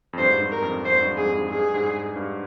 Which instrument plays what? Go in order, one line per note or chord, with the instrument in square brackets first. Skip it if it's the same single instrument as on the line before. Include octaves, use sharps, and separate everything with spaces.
[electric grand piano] F2
[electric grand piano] G2 [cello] C5
[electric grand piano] G#2
G2
[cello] A#4
[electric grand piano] F2
[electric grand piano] F2 [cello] C5
[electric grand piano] G2
G2
[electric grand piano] F2 G#2 [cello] G#4
[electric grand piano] G2
[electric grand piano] G2 [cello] G#4
[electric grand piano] G#2
G2
G2